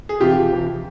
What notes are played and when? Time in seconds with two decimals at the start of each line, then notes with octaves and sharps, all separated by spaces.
0.09 G#4
0.20 F2 C3 E3 F4 G4
0.51 F2 C3 E3